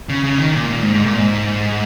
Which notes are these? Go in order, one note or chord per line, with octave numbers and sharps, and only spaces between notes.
C#3
C#3
D#3
A#2
A#2
G#2
G#2
A#2
G#2